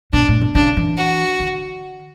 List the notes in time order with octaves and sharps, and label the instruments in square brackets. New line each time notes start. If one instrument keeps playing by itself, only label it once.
[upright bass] B2 [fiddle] D4
[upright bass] A2
B2
[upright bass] C#3 [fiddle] D4
[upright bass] E3
[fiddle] F#4
[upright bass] D3